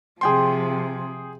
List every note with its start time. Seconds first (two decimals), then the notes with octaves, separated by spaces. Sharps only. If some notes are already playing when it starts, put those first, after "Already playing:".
0.21 C3 F3 G#4 G5 C6